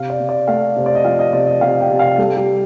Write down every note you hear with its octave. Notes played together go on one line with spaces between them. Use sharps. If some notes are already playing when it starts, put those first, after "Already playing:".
Already playing: C3 F5
D5
C3
D5
A3 F5
C3 C5
D5
D#5
F3 F5
D#5
C3 D5
D#5
C3 F5
G5
C3
F5
G3 A4
G4